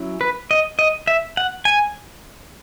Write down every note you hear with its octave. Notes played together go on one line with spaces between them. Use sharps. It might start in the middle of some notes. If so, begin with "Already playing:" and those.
Already playing: F#3 C#4 E4
B4
D#5
D#5
E5
F#5
G#5